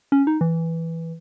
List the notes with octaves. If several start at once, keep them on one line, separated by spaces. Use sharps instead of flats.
C#4
D#4
E3